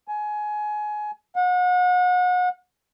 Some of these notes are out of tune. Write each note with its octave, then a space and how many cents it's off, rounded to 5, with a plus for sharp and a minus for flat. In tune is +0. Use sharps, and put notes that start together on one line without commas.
G#5 +20
F#5 -35